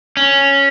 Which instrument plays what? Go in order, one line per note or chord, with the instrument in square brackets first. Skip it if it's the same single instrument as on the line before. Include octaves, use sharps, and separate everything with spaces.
[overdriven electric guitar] C#4